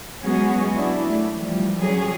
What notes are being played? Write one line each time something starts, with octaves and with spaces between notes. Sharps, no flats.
F#3 G#3 B3 C#4 F#4 G#4
D4 E4
A3
E3 F3 G3
F#3 G3 C#4 G#4